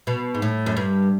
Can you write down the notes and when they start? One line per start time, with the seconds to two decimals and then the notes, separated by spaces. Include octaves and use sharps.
0.07 B2
0.35 G#2
0.42 A2
0.66 F#2
0.77 G2